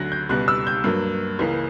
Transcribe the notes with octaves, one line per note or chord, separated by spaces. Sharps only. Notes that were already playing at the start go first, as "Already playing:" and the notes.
Already playing: D2 D3 F#3 F#6 A#6
G6
C#2 B2 G3 F#6
E6
G6
G2 F#3 A#3
C#2 C#3 E3 A#3